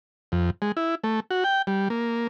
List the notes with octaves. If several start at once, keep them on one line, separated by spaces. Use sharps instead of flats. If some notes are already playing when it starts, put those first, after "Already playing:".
F2
G#3
E4
A3
F#4
G5
G3
A#3